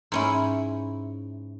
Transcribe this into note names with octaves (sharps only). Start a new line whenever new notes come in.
G#2 C#4 E4